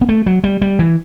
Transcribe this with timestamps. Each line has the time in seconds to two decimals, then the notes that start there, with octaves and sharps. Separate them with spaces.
0.01 B3
0.09 A3
0.26 F#3
0.44 G3
0.62 G3
0.79 E3